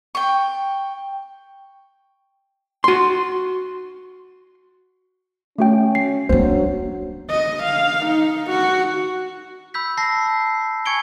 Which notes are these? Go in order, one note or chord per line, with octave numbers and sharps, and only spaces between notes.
G5 C#6
F#4 C6
A3 C#4 F#4 G5
C7
F#3 A#3 D4 C5
D#5
F5
D#4
F#4
B5 E6 G6 B6
A5 A#6 C7
G#5 C#6 G#6 C#7 D7 G7